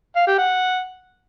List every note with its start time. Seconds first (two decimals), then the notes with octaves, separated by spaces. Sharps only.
0.16 F5
0.27 G4
0.38 F#5